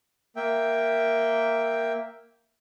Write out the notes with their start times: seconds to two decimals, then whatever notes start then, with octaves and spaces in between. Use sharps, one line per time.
0.36 A#3 E5 G5